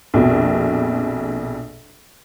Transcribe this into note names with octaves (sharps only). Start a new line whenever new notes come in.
A#1 F2 B2